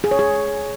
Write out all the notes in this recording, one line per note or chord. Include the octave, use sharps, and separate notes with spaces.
G#4
C#5
G#4